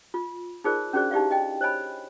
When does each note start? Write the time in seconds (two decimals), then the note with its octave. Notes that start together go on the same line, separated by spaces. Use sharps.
0.14 F4
0.64 D#4 F4 G#4 A#4 C5 D5
0.93 C#4 D4 F#4 G#4 C5 D5
1.11 D#4 E4 G4 D5 E5 F5
1.31 D#5 G5
1.61 C5 C#5 D#5 G#5 B5